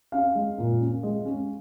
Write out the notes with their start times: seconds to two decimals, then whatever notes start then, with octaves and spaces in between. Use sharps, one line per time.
0.12 C#4 F5
0.35 G#3
0.58 A#2
0.80 C#4
1.03 G#3
1.25 C#4